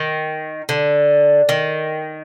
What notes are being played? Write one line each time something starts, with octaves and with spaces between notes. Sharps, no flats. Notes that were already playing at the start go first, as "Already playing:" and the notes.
Already playing: D#3
D3
D#3